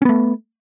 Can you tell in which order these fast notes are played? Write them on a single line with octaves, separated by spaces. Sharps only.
C#4 B3 A3